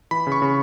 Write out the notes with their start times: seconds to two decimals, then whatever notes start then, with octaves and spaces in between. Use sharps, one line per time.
0.11 E3 B5
0.27 C#3
0.32 C#6
0.42 C#3